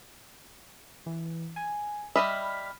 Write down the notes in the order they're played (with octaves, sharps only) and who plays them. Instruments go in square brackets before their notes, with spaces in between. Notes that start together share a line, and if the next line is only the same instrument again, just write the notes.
[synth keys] E3
G#5
[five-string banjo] G3 D#5 E5 [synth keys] B5 F6 B6